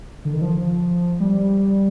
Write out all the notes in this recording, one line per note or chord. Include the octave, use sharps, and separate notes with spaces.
D3
D#3
F3
G3